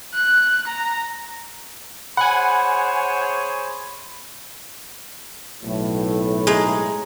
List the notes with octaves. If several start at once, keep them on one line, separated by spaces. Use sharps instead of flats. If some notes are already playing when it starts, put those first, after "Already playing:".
F#6
A#5
G#4 C5 C#5 F#5 G#5 B5
B1 A2
G#3 D#4